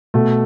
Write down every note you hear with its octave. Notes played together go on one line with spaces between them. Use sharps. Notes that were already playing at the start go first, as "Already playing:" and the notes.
B2 A3